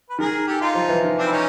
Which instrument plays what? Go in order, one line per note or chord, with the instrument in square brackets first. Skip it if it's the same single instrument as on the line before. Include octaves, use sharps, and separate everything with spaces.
[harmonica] B4
[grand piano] D#3 [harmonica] G#4 A#4
[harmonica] G4 A4
D#4 F4
[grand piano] F3
E3
D#3
[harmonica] C4 D4
E4
C#4 D#4